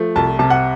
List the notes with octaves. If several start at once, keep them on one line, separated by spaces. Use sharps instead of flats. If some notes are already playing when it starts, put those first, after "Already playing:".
Already playing: F3 A3
C2 A5
C3 A5
F#5